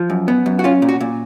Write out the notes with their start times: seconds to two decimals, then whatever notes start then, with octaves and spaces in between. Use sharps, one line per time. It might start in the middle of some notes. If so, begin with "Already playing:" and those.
Already playing: F3
0.10 F#2
0.28 B3
0.46 F#2
0.59 F#4
0.64 C#4 F4
0.82 A#2
0.89 F#4
1.01 A#2